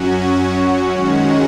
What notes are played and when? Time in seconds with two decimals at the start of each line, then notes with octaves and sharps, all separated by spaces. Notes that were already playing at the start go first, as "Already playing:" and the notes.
Already playing: F#2 F#3 C#4 F#4
0.92 D#3 G#3 C#4 F#4